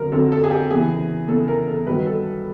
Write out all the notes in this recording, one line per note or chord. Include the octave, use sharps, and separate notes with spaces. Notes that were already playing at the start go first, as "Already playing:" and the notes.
Already playing: F2 D3 F#3 A#4
F2 D3 F#3 A4
A4
G#4
G4
E2 C#3 E3 G#4
E2 C#3 E3 A4
A#4
A4
G2 D#3 F#3 B4
A4